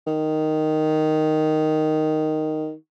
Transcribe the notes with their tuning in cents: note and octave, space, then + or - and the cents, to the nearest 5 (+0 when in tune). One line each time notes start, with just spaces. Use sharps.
D#3 -5